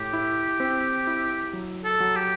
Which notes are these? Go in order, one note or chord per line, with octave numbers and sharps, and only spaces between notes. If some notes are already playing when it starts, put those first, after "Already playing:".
Already playing: A2 G4
E4
C4
E4
F#3
A4
F#3
G4